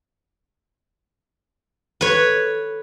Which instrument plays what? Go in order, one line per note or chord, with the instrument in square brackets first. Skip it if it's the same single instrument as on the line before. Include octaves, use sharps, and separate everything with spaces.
[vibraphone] A4 [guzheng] B4 C#5